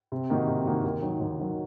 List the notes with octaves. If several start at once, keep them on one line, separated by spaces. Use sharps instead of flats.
C3
D#3 A#3 D#4 F#4
C3
D#3 A#3 D#4 F#4
D#2
D#3 F#3
D#2
D#3 F#3